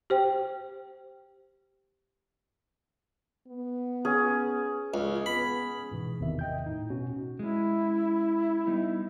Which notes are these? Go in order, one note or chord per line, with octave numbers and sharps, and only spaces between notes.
G4 C5 G5
B3
C#4 G#4
C#2
B3 B5
G#2 B2 E3
G1 E2 C3 D#3 E5
D#5 G5 G6
A2 D#4
B2 C#4 F#4
G#3 C#4 E4
G3 B3 D#4